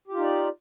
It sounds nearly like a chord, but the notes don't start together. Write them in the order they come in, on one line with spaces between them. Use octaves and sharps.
G4 F4 D#4 D5